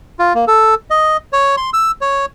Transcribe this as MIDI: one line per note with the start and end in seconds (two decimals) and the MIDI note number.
0.19 0.33 65
0.35 0.45 58
0.47 0.75 69
0.90 1.17 75
1.33 1.56 73
1.57 1.70 84
1.73 1.91 88
2.01 2.26 73